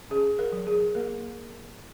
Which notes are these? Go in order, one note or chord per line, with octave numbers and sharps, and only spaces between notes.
C#4 G#4
A#4
F#3
G#4
A#3 A#4